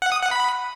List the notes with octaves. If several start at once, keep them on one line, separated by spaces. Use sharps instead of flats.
F#5
D#6
F#5
B5